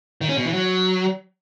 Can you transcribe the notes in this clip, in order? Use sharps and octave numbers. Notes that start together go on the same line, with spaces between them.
D#3
C#4
B2
E3
F#3